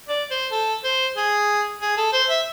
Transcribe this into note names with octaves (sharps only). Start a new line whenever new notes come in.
D5
C5
A4
C5
G#4
G#4
A4
C5
E5